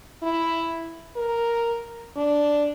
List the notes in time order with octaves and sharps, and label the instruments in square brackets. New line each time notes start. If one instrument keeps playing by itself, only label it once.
[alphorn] E4
A#4
D4